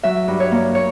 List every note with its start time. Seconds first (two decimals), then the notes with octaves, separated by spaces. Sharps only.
0.03 F#3 E5
0.28 G2
0.40 C#5
0.52 A#3
0.75 C#5